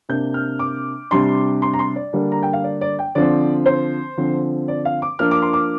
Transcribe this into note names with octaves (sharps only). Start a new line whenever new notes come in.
C3 A#3 D4 G6
F6
D6
C3 G3 D4 C6
C6
A#5
C6
D5
D3 G3 A#3 D4
A#5
G5
F5
D5
D5
G5
D3 F3 C4 D5
C5
D3 F3 C4
D5
F5
D6
F3 A#3 D4 F6
D6
C6
D6